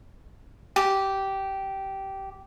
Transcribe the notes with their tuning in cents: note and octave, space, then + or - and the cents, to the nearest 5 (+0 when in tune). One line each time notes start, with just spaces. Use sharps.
G4 -15